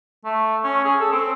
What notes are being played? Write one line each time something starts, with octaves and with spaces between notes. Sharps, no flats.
A3
C#4
G#4
A4
C4